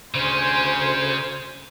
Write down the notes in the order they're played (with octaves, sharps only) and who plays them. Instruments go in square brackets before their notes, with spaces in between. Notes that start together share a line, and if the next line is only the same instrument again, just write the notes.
[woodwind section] D2 C5 [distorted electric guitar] C#3 C#4 [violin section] G#5 C6 G#6